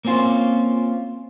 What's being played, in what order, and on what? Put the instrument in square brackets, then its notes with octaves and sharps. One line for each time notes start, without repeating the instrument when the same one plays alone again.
[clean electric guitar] A#3 C4 C#4 F4 C5